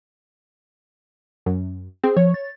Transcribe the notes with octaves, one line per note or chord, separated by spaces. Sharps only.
F#2
C4 G#4
F3 C#5
A6